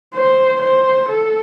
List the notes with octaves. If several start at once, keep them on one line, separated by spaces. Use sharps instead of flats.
C5
C5
A4